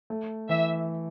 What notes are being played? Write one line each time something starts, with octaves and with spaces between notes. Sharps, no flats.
A3
E3 E5